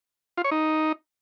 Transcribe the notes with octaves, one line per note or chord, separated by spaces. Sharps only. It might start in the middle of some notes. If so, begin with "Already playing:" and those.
F4
C#5
D#4